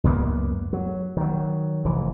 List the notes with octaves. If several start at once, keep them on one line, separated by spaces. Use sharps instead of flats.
C#2 F#2 A#3 B3
F#3
D#3 F#3
F1 E3